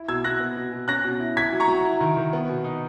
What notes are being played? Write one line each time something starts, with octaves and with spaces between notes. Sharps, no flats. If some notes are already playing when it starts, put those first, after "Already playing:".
Already playing: E4
B2 E6 G#6
B2 F#6 A#6
B3
B2
B2
C#4 F#6 A#6
B2
E4
E4 G#6 B6
F#3
A#5 C#6
F#3
E4
D#3
D#3
B3
B2
D#4